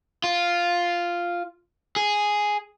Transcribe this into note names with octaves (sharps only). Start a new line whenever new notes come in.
F4
G#4